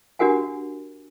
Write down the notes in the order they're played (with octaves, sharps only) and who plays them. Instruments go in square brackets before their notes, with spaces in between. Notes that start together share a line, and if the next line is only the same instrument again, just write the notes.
[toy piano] D4 F#4 G4 A#4 F#5 G#5